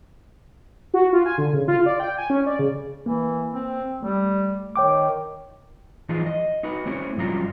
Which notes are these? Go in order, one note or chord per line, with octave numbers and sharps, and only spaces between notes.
F#4
F4
G#5
D3
C#3
F4
D5
G5
G#5
C#4
D5
C#3
E3 A#3
C4
G3 A3
D#3 C#5 G5 D6
E3 F3 D#4 F4 G#4
D#5
D#4 F#4 B4
A3 C4 C#4 E4
G2 C#3 F3 F#3 F4 A#5